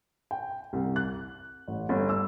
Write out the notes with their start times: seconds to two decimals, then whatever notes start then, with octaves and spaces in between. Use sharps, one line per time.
0.31 G5
0.73 C2
0.96 F#6
1.68 A1
1.89 G1
2.09 E6